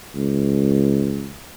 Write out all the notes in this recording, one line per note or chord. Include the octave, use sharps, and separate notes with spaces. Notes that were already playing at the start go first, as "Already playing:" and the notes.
C#2